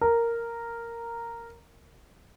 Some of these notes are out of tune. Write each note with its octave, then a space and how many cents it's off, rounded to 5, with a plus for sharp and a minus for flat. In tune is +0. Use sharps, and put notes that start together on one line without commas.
A#4 -5